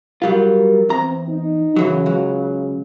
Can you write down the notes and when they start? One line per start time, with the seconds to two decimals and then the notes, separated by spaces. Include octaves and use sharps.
0.22 F#3 G3 F4 A#4
0.89 E2 C4 A#5
1.29 D#4
1.76 F#2 C#3 E3 F#3
2.06 C#2 F#3